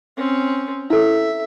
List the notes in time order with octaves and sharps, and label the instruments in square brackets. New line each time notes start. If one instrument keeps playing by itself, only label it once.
[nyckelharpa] C4 C#4
[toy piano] E4 A4 [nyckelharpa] E5